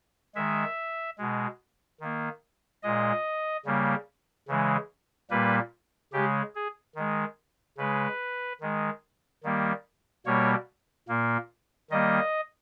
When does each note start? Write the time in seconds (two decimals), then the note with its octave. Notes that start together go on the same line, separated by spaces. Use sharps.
0.35 D#3 G#3 E5
1.18 B2 G#3
2.01 D#3 A#3
2.83 A#2 G#3 D#5
3.65 C#3 G3 A#3
4.48 C#3 E3 G#3
5.30 A#2 G3 A#3 B4
6.13 C#3 G#3 G4
6.55 G#4
6.96 D#3 G#3
7.78 C#3 G#3 B4
8.61 D#3 G#3
9.44 D#3 G3 A#3
10.26 B2 G3 A#3 C#5
11.09 A#2 A#3
11.90 D#3 G3 A#3 D#5